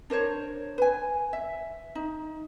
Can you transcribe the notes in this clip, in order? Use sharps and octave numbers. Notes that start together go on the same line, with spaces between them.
D4 A#4 C5 C#5
B4 G#5
E5
D#4